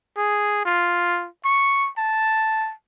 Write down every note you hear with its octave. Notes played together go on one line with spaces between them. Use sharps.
G#4
F4
C#6
A5